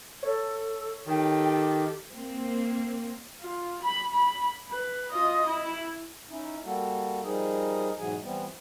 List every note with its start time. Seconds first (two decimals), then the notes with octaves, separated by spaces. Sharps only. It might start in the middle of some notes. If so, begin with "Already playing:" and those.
0.23 A4 C#5
1.07 D#3 G4 A4 G5
2.11 A#3 C4
3.40 F4
3.82 B5
4.12 B5
4.68 B4
5.12 F4 D#5
5.47 E4
6.30 C#4 D#4 E4
6.64 G3 A#3 F#4 A4
7.23 F3 G3 D#4 G#4 A#4 D#5
7.98 G#2 B2 E3 F#3 G#4 G#5
8.22 E3 G3 B3 C4